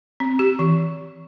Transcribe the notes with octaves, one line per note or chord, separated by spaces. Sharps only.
C4
G4
E3